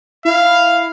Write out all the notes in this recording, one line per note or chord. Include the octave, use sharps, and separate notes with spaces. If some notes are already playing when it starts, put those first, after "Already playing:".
E4 F5